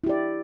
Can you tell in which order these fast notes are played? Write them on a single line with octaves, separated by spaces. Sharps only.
E4 G4 D5